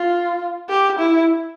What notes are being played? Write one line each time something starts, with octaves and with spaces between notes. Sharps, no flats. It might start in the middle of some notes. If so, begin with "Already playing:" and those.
Already playing: F4
G4
E4